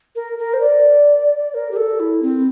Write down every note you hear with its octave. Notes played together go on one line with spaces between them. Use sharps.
A#4
A#4
C5
D5
A#4
G4
A4
E4
C4